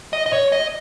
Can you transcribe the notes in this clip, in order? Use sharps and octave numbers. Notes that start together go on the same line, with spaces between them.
D#5
D#5
C#5
D#5